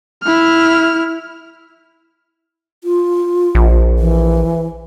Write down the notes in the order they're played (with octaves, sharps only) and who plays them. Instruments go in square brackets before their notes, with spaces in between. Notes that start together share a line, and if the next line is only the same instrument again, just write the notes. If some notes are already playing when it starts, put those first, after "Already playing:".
[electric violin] E4 F6
[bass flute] F4
[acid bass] A#1
[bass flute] E3